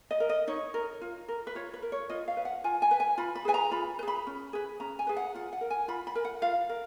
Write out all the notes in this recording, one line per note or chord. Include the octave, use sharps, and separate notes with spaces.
D#5
A#4
D#5
D#4 C#5
A#4
F4
A#4
B4
F4 C#5
B4
A#4
C#5
F4 D#5
F5
B4
F#5
F4 G#5
G#5
B4
G#5
F4 B5
B5
G#4 B4 G#5
A#5
F4 B5
B4
G#4 B5
C#4
G#4 B4
C#4 A#5
G#5
G#4 B4
F#5
F4 F#5
F#5
A#4
G#5
F4 B5
B5
A#4
F#5
F4 F5
A#4